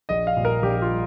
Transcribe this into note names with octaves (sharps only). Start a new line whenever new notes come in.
A#1 D#5
F5
A#2 G3
A#4
A#1 G4
F4
G3